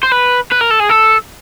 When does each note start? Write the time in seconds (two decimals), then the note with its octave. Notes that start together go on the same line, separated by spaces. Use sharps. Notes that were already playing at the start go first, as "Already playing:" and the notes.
0.03 C5
0.12 B4
0.52 B4
0.61 A#4
0.70 A4
0.80 G#4
0.89 A4